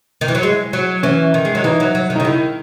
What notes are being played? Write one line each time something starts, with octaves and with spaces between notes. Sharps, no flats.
D#3
E3
F#3
G#3
F#3
E3 C#4
D#3
G#3
F#3
E3 D#4
F#3
F#3
D#3
D#4
C#3
D#3 E4